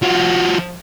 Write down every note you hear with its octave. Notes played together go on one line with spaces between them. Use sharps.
F3 F#4